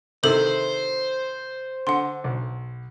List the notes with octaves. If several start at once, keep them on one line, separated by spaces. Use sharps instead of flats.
C3 D#3 E4 A4 C5 F#7
D3 F#5 C6
B1